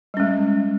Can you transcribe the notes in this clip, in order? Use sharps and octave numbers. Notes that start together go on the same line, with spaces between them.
G3 G#3 C#4